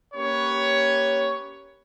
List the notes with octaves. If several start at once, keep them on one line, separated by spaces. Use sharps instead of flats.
A#3 C#4 G4 B4 C#5